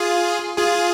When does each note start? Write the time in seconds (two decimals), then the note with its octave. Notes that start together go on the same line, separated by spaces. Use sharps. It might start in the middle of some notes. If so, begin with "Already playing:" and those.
Already playing: F4 G#4
0.58 F4 G#4